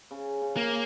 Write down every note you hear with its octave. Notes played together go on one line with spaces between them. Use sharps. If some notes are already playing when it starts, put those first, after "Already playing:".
C#3
C#3
A#3